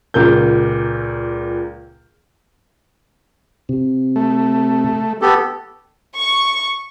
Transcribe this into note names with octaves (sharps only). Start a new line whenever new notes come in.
C#2 A#2 A#4 G6
C3
A3
B3 G4 A4
C#6